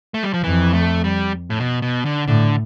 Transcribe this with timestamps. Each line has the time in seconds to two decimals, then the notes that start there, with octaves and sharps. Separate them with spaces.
0.14 A3
0.23 G3
0.34 F3
0.43 F2 E3
0.73 A3
1.04 G3
1.50 A2
1.59 B2
1.82 B2
2.06 D3
2.27 A2 D3